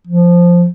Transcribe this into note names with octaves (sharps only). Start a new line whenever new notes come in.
F3